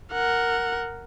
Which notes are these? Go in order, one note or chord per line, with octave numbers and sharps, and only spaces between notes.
A#4 F#5